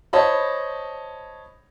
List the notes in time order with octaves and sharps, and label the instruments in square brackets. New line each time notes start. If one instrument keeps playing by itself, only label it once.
[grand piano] C5 C#5 D#5 A5 B5